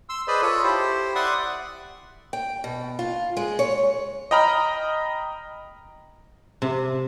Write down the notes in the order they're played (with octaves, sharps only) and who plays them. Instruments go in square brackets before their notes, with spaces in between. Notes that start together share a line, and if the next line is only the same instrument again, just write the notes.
[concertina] C6 E6
G#4 B4 C5 D5 D#5 B5
F4 A4 C#5
E4 G4 C5
D5 E5 F#5 C6 D6 D#6
[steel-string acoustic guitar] G5
B2
F4
G#3
C#5
[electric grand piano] D#5 G5 A#5 B5 F6
[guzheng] C3